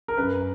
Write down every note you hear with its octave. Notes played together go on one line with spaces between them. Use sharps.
A#4
F#2 B4